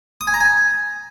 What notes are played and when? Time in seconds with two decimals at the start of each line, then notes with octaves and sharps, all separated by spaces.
0.21 D#6
0.27 G#5
0.34 A#5
0.40 G#5